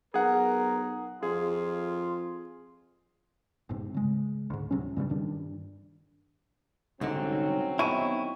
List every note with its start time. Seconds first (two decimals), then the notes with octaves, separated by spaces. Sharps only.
0.14 B1 G#4 A#4 F#5
1.23 F2 F4 G#4
3.69 G1 G#2 C3
3.94 C#3 G#3
4.50 D2 G#2
4.71 C#2 C3 F#3 C#4
4.97 G2 C#3 F3 G3
5.10 G2 D#3 D4
7.01 C2 G#2 D3 F#3 C4 C#4 D#4 F#4
7.79 A2 D#3 B3 E4 C#6 D#7